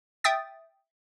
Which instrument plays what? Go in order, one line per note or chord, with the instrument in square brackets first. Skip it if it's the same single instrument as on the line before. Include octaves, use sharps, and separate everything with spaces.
[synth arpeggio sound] E5 G5 D#6 A6